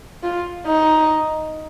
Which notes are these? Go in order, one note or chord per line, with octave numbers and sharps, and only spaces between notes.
F4
D#4